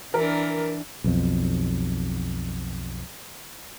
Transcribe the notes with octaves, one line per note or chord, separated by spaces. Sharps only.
E3 D4 A#4
B1 F2